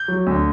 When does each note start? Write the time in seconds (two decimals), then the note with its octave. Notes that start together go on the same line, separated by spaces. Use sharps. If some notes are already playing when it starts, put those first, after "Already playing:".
Already playing: G6
0.08 F#3
0.27 D2